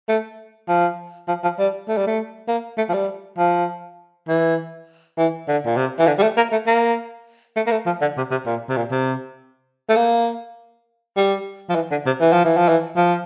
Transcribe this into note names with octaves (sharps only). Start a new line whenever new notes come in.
A3
F3
F3
F3
G3
A3
G3
A3
A#3
A3
F3
G3
F3
E3
E3
D3
A#2
C3
E3
D3
G3
A3
A#3
A3
A#3
A3
A#3
A3
F3
D3
C3
C3
A#2
C3
A#2
C3
A3
A#3
G3
F3
E3
D3
C3
E3
F3
E3
F3
E3
F3